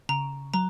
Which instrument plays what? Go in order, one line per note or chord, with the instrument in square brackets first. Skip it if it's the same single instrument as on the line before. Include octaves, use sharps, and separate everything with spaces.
[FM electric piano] C#3 [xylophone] A#5
[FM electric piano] F#3 [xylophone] A#5